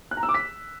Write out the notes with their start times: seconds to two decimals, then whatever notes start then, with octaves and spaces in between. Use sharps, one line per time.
0.11 F#6
0.17 A#5
0.23 E6
0.29 D6
0.34 B6